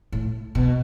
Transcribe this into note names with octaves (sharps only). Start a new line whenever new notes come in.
A2
B2